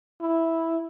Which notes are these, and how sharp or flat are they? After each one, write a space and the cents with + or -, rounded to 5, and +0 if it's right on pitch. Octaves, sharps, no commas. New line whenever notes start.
E4 -5